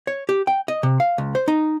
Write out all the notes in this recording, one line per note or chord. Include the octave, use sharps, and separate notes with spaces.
C#5
G4
G5
D#5
C3
F5
C#2
C5
D#4